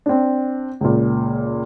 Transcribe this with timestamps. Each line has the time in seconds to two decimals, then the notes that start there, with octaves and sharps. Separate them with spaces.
0.06 C4 D4
0.81 C#2 A#2